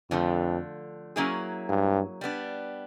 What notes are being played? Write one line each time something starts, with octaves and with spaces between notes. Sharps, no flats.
F2 D3 F3 A3
F#3 A#3 C#4 E4 G#4
G2
G3 B3 D4